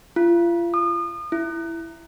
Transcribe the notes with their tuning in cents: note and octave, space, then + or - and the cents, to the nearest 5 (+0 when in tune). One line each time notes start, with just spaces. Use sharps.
F4 -35
D#6 -35
E4 +10